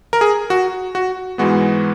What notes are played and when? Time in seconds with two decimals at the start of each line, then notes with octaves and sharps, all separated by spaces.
0.13 A#4
0.21 G#4
0.50 F#4
0.95 F#4
1.38 G#2 E3 G#3 B3 F#4